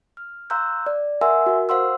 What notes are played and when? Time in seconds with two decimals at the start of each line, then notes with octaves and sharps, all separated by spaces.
0.17 F6
0.50 F5 A#5 C6 E6 F#6 G6
0.86 D5
1.21 A#4 E5 F#5 G#5 C6 E6
1.46 F#4 A#4
1.69 C5 F5 F#5 C6 E6